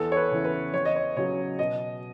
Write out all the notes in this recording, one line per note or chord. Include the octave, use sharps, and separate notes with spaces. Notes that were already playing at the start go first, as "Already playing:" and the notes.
Already playing: E2 A4
C#5
B4
C#3 E3
B4
E2 C#5
D#5
C#5
C#3 F#3 C#5
B2 D#5